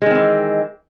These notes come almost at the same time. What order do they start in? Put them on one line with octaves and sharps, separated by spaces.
G#3 D#3 C4 E3